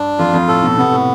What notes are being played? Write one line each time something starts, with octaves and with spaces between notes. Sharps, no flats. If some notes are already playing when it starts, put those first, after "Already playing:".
Already playing: G2 D4
F2 F4
F2
A2 A4
B2
C3 B3
A2